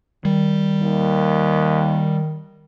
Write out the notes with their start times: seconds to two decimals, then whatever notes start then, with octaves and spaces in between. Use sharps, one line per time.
0.25 D#3 G3
0.82 D#2